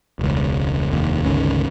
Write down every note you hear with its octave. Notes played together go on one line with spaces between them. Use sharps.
E1 C#2
F1 D#2
G1 C#2 D#3 C#4